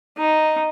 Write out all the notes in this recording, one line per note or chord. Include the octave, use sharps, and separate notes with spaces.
D#4